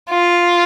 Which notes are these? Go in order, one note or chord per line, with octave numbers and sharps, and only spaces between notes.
F4